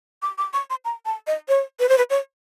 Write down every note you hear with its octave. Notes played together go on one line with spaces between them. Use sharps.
D6
D6
C#6
C6
A#5
A5
D#5
C#5
B4
C5
B4
C#5